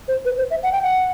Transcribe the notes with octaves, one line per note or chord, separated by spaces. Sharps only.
C5
B4
C5
E5
F#5
G5
F#5